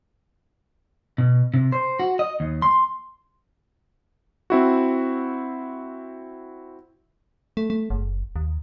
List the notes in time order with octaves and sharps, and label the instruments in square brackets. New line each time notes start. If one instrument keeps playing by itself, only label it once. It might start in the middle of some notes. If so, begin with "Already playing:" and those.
[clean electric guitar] B2
C3
C5
F#4
D#5
D#2
C6
[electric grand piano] C4 E4 F#4
[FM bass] A3
A3
F#1
D#2